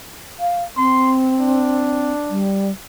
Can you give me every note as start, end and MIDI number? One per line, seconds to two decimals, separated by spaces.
0.40 0.64 77
0.77 2.12 60
0.77 1.15 84
1.40 2.48 62
2.31 2.71 55